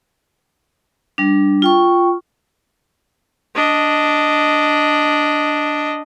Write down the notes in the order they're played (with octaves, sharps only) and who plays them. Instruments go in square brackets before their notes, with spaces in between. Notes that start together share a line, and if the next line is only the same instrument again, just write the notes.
[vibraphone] G3 D4
F4 G5 C#6
[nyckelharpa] D4 D#5